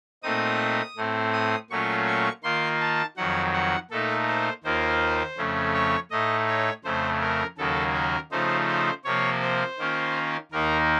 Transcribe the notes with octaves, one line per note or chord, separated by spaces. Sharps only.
A#2 A3 C4 D#4 D#6
A2 A3 C4
D#6
A#2 F#3 A3 C#4 F4 C#6
C#6
D#3 A#3 F4 C6
A5
F2 D#3 F#3 F#5
F#5
A#2 A3 D#4 A4
C5
D#2 D#3 A#3 F4 C5
F2 C#3 A3 C#4
C#5
A2 A3 D#4 D#5
C#5
F2 C#3 A3 C5
A#4
D#2 C#3 F#3 A#3 A4
A#4
C#3 F3 A3 D#4 C5
C5
C3 F3 A#3 C#5
C5
D#3 A#3 C#4 F4
D#2 D#3 A#3 D#4 A#4